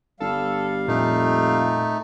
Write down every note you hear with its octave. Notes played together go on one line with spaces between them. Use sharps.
G1 G3 A4 F5
F2 A#2 A3 D#4